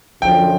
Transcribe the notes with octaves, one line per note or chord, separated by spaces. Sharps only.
F#2 D3 F3 G5